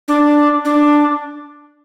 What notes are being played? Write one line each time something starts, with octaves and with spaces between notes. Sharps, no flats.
D4
D4